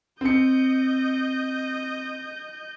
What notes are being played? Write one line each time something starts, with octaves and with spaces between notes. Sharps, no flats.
C4 D#5 G6 C#7